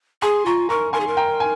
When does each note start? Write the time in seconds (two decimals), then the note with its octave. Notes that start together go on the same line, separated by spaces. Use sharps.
0.22 G#4 G#5 C6
0.46 F4 A#5 C#6
0.69 A#4 A#5 C#6
0.93 A#4 G#5 C6
1.00 G#4
1.07 A#4
1.17 G5 A#5
1.40 G#5